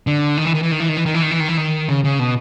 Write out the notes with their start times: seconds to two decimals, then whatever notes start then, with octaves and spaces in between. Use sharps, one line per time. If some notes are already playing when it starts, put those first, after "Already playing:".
0.07 D3
0.37 D#3
0.45 E3
0.54 D#3
0.63 E3
0.72 D#3
0.80 E3
0.89 D#3
0.97 E3
1.06 D#3
1.14 E3
1.23 D#3
1.31 E3
1.40 D#3
1.48 E3
1.57 D#3
1.89 C#3
2.04 C#3
2.19 B2